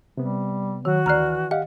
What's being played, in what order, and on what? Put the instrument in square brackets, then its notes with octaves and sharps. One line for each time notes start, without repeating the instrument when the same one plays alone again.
[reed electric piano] C3 B3 [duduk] G3
[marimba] D#3 [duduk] F#3 [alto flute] F#4
[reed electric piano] D2 F6 F#6 [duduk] E3 [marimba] D5 A#5
[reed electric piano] G4 F5 F#5 [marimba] D#5